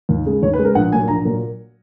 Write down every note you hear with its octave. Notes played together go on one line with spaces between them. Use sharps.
D#2
C#3 G#3
D#2 C#5
B4
C#3 G#3
A#4
A#1 F#5
A#2 F#3 A#3 G#5
A#1 A#5
A#2 F#3 A#3